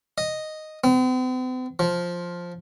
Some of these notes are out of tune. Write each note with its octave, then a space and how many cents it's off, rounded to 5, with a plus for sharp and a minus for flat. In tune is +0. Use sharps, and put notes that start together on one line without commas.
D#5 -5
C4 -45
F3 +5